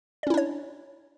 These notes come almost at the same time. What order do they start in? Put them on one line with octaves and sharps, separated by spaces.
D5 C#4 E4 D4 C#5